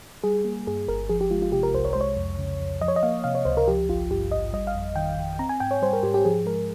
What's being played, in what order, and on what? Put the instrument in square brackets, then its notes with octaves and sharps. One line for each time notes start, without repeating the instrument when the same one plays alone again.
[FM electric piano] G3 G#4
A#3
G2 G#4
G1 A#4
F3 G#4
G4
G#3 F4
F4
C3 G4
A#4
C2 C5
C#5
G#3 C5
C#5
F2
C#3
F2
F3 D#5
C#5
D#5
A#3 F5
C3 F5
C#5
C#2 C5
A#4
F3 G4
G#1 F4
G2 G4
G#1 D#5
G3 D#5
F5
F2
D#3 G5
F2
C4 A#5
G#5
G#2 G5
C#5
G3 C5
A#4
G#2 G4
G4
F3 G#4
G#3 A#4